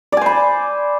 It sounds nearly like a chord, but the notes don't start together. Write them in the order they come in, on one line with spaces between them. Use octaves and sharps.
D5 G#5 C5 B5